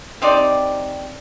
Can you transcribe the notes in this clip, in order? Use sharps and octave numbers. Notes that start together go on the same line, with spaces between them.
C4 D#4 G4 D5